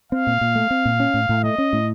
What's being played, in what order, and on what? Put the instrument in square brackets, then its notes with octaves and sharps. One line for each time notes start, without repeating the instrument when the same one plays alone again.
[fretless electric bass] C4 [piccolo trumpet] F5
[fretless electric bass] A#2
A#2
A3
C4
A#2
C#4
A2
A2
[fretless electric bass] A3 [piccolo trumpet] D#5
[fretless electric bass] C#4
A2